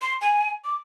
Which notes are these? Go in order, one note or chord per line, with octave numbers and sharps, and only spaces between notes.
C6
G#5
D6